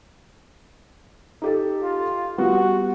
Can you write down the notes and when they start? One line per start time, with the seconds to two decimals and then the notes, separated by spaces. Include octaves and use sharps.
1.42 D#4 G4 A4
1.83 F4
2.38 G3 B3 F4 F#4